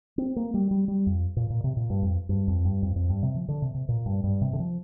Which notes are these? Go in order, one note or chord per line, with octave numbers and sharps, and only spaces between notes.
C4
A#3
G3
G3
G3
F2
A#2
A#2
C3
A#2
G2
F2
G2
F2
G2
F2
F2
G2
C3
F3
D3
C3
C3
A#2
G2
G2
C3
D3
F3